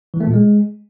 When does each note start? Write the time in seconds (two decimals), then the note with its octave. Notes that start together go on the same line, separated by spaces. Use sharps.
0.14 E3
0.20 A3
0.27 A#2
0.34 G#3